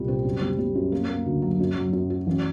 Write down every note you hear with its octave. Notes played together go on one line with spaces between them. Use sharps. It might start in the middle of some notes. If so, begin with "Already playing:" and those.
Already playing: C2 A#2 G3
C4
F#2
G3
G3
F#2
A#3
A#3
D2
F#3
F#2
F#3
F#2
F#4
A1